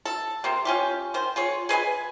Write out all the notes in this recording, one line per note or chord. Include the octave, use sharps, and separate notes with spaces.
A4
C3 A#3 C4
C#4 F4 G4
D#3 C5
F4 G#4 C#5
G#4 B4 D#5 G#5